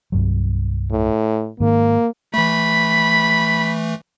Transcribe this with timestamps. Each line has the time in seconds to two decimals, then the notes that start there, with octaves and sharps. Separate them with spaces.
0.12 C2 G2 F#3
0.91 A2
1.60 G#2 D#3 A#3
2.34 E3 A3 B5